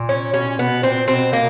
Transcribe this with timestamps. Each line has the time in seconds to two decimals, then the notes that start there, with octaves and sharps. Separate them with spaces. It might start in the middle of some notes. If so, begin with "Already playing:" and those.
Already playing: A#2
0.09 C#4
0.34 B2 C#4
0.46 A#2
0.59 B2 B3
0.83 A#2 C4
1.08 B2 C4
1.33 A#3